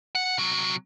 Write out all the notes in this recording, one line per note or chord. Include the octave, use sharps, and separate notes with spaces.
F#5
C3 F#3